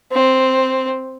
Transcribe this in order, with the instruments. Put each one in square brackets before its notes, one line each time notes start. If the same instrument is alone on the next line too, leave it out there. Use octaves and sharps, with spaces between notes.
[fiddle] C4